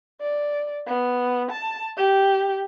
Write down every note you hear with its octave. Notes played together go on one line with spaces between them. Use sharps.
D5
B3
A5
G4